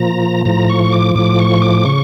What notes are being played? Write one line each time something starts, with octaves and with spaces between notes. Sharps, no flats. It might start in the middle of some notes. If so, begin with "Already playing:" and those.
Already playing: A#2 F3 A#5
A2 F3 A#5
C#6
D6
A2 F3 D6
C#6
D6
C#3 C#6